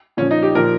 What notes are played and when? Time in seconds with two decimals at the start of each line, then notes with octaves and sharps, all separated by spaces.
0.17 A#2 F3 C#4
0.31 D#4
0.43 G4
0.55 A#2 F3 A#4